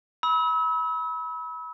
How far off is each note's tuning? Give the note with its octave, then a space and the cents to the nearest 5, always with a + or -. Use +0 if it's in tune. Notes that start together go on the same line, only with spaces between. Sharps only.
B5 -20 E6 -35